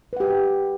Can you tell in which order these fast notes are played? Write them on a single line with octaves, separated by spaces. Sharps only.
B4 F#5 G4